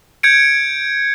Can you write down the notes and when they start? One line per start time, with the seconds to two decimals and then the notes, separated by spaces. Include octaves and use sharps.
0.23 G6 G#6 C#7 D7